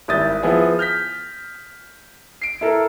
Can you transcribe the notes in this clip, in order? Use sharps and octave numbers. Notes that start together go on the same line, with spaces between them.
G#1 G3 E4 D#6 G6 A6
F3 B3 E4 G#4
F6 G6 A#6 B6
C7 D7
E4 A4 A#4